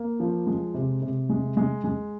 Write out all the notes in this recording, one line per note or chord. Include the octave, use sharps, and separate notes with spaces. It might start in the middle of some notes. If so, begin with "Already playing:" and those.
Already playing: A#3
F3
G#3
C3
C3
G#3
G#3
G#3